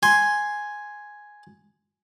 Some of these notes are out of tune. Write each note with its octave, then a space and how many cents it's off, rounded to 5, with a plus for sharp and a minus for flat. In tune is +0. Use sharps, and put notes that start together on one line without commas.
G#5 +0 C6 +0